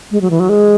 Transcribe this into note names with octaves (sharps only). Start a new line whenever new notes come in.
G#3
F#3
E3
F#3
G#3